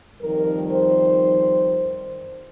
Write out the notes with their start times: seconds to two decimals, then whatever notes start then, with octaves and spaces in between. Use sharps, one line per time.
0.21 F2 D#3 G3 A#4
0.71 C5